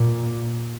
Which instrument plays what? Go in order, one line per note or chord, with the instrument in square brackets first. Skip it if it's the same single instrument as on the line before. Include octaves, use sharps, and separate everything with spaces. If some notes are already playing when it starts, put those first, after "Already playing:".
Already playing: [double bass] A#2